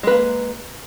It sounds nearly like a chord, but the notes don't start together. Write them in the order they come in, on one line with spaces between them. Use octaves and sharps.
G#3 B4 A#3